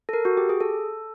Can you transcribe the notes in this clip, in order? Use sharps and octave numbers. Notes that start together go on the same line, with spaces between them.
A4
A#4
F#4
G4
G#4
A4